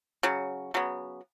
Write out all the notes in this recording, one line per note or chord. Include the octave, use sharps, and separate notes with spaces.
C#3 F#3
C#3 F#3 B3